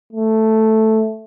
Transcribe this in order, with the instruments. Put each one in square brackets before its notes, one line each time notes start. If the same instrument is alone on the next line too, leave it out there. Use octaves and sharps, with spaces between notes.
[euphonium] A3